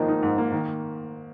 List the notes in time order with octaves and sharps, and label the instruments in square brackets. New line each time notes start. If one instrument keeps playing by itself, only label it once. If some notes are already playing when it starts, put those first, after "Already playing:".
Already playing: [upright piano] G#2 F3 A#3 [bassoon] D#3
[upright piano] D#4
G#2
A#3
D#3